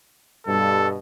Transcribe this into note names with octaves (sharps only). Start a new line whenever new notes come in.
G2 B2 A4